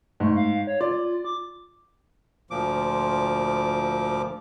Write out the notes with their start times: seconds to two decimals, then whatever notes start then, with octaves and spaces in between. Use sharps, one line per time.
0.20 G#2 A3
0.36 F5
0.67 C#5
0.81 F4 D5
1.25 D6
2.51 D2 A#2 F3 D6